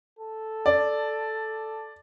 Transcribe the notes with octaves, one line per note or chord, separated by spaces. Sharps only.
A4
D5